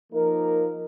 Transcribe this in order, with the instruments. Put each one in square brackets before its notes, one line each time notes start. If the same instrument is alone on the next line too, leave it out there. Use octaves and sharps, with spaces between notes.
[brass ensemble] F3 A#3 D#4 A#4